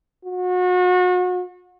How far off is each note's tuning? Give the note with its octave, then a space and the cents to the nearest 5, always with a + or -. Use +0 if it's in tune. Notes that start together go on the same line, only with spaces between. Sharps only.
F#4 -35